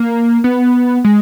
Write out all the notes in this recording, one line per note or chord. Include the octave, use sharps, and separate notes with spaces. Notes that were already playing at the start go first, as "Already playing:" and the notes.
Already playing: A#3
B3
G#3